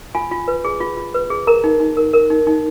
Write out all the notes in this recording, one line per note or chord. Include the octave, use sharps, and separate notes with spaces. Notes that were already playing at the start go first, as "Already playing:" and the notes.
F4 G#5
F4
B4
G#4
F4
F4
B4
G#4
A#4 A#5
D#4
D#4
A#4
A#4
D#4
D#4